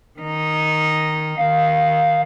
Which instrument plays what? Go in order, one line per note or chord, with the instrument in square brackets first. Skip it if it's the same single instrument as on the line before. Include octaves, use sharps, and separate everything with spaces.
[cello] D#3 D#4
[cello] D#3 [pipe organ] F5